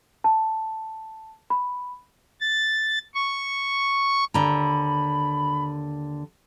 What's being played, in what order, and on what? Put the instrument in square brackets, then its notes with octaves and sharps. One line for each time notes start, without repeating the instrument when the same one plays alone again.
[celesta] A5
B5
[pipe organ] A6
C#6
[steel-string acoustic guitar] D#2 D3 A#5 [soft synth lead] B5